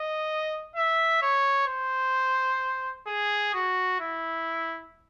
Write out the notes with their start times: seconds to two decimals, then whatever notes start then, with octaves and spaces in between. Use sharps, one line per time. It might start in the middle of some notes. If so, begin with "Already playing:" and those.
Already playing: D#5
0.76 E5
1.22 C#5
1.67 C5
3.07 G#4
3.54 F#4
4.00 E4